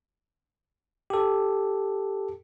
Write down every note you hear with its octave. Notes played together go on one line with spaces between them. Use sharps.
G4 A4